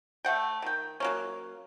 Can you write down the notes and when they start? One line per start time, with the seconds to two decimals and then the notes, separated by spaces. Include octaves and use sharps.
0.25 A3 F#5 G5
0.62 D#3 G5
1.00 F#3 A#3 C#4